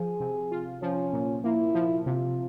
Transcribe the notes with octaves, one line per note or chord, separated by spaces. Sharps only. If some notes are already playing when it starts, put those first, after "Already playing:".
Already playing: F3 G#4
C3
F4
F3 C#4
A#2
A#3 E4
F3
C3 F4